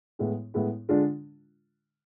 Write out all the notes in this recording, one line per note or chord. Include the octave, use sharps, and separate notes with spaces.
A2 G#3 B3 E4
A2 G#3 B3 E4
D3 G#3 D4 F4